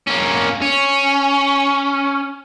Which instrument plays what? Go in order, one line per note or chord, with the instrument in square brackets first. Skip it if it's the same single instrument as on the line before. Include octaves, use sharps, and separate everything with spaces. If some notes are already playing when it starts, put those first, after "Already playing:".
[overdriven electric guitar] A#3 C#4
C#4